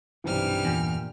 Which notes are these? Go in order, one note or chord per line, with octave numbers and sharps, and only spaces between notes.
B1 G2 C3 E3 G3 F6
E2 A#2